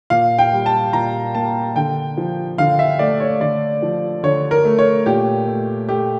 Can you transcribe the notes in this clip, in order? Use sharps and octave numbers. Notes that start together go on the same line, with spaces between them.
A#2 F5
G5
G3
A5
A#2 A#5
A#3 A5
D3 G5
F3
D3 F5
E5
A3 D5
C#5
D3 D5
F3
D3 C#5
A#4
A3
C#5
A#2 G4
A3
A3 G4